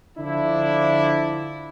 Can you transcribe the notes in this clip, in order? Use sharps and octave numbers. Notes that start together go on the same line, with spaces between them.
D3 F3 D4 E4